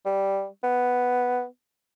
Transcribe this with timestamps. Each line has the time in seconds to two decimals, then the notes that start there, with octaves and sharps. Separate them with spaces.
0.06 G3
0.64 B3